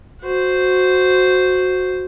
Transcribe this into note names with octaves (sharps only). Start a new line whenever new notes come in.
F#4 C5